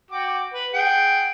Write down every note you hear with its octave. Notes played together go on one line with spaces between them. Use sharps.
F#4 G5 D6
B4
G#4 F#5 G5